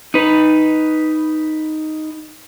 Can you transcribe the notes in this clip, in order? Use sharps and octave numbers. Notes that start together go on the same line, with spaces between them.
D#4 B4